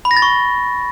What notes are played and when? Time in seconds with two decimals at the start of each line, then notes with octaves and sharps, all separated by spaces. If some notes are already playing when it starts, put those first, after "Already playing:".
0.05 B5
0.11 A#6
0.17 A6
0.22 C#6